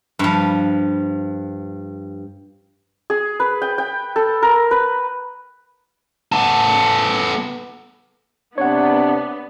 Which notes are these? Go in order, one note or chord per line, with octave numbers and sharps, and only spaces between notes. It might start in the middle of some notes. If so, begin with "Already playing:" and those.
G2 F3
G#4
B4
G5
G5
A4
A#4
B4
B3 A4
C3 B3 D4 C#5 F#5